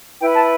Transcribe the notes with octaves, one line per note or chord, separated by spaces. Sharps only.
E4 B4 G5
A5